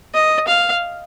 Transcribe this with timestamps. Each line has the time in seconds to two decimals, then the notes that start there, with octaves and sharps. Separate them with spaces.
0.14 D#5
0.47 F5